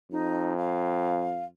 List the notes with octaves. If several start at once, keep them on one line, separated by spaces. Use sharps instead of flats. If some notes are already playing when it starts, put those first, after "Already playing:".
F2 D#4
F5